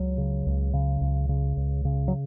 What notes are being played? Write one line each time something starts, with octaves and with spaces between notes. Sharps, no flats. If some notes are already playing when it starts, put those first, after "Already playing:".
Already playing: C#2 F#3
C#3
C#2
C#3
C#2
C#3
C#2
C#3
F#3